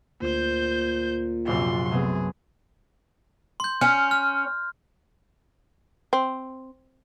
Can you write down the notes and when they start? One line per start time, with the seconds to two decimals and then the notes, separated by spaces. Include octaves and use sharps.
0.22 D2 A#2 C5 G6
1.47 A#1 F#2 C3 C6
1.91 B1 C3 A3 B3 C4 G#4
3.60 C6 G6
3.81 C#4 F6
4.11 F6
6.13 C4